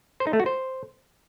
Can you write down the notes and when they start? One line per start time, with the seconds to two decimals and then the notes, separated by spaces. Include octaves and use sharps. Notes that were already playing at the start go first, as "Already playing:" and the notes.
0.20 C5
0.27 D#4
0.33 A3
0.40 F#4
0.46 C5